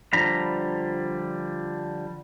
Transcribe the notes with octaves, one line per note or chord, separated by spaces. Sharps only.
D3 F3 G3 D4 A#5 B5